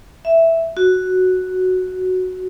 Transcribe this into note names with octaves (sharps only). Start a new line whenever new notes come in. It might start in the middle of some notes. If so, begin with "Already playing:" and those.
E5
F#4